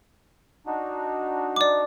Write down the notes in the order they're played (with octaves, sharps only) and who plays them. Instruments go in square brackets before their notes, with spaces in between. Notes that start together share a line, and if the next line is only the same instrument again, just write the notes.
[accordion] D4 D#4 F#4
[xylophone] D5 D6